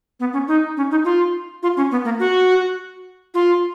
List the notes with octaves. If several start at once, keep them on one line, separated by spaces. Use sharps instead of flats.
B3
C#4
D#4
C#4
D#4
F4
F4
C#4
B3
A#3
F#4
F4